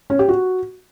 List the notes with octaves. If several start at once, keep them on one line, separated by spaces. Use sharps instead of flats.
C#4
G4
F#4